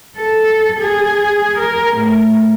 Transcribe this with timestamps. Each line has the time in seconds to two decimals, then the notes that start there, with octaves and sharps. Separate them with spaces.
0.16 A4
0.79 G#4
1.58 A#4
1.97 A2